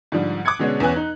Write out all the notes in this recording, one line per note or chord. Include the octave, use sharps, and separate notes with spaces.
G#2 D3 F3 G3
D6 D#6 F#6 G#6 C#7
B2 D3 G#3 C#4 D4
E2 E3 C#4 G#5 F#6
D#4